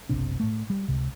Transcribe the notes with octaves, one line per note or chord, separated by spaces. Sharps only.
F#1 B1 C3 D4
A2 A3
G3
C#2 C3